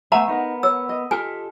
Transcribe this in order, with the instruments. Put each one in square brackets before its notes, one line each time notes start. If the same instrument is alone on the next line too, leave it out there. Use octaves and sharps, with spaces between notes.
[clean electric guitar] A3 B3 G#5 [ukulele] E5 [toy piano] F#5 A#5
[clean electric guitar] B3 A#4 [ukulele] D#4
[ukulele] C#5 [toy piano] E6
[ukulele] D#5
[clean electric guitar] F4 G4 A4 [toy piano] G#5